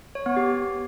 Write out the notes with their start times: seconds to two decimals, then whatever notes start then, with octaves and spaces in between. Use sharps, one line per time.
0.15 C#5
0.26 B3
0.37 G4